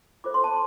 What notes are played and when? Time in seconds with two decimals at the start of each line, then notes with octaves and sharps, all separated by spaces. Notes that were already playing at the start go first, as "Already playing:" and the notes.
0.24 F4 A4 C5 D6
0.34 C6
0.44 A5